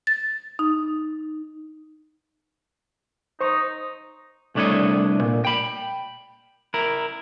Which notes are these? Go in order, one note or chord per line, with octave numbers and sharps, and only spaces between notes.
A6
D#4
D#4 C5 C#6
C2 A3 D4 E4 C#5 D#5
A#2
G5 B5
E4 A#4